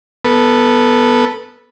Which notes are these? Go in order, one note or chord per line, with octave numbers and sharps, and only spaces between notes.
B3 A4 B4